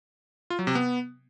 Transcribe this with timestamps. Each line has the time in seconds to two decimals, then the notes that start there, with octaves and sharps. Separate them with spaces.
0.50 F4
0.59 F#3
0.67 C3
0.75 B3